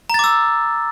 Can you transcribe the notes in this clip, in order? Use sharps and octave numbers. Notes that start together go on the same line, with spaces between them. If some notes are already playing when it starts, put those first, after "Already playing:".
A#5 D6 E6 A6